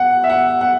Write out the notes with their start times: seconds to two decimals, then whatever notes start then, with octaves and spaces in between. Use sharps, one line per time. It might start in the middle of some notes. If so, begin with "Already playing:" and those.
Already playing: F#5
0.24 E5
0.29 F#5
0.61 F#5